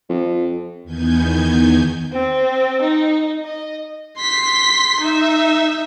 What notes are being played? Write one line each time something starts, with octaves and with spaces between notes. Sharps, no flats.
F2
E2 D#3 B3 G#5 G6 G#6
C4
D#4
D#5
C6 B6
D#4 E5